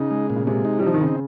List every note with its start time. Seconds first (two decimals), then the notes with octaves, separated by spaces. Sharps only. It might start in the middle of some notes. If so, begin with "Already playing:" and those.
Already playing: C#3 D#4
0.11 G#3
0.30 A#2
0.36 C#3
0.47 C3 G#3
0.65 D#4
0.79 G3
0.83 F3 D#4
0.94 D#3
1.01 C#3 C4